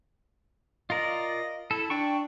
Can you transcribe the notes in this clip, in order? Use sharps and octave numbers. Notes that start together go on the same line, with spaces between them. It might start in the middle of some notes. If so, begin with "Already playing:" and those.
F4 A#4 D5 D#5
E4 A4
D4 D5 G5 C#6